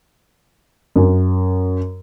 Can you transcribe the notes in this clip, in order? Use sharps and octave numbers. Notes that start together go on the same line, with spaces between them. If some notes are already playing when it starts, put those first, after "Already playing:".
F#2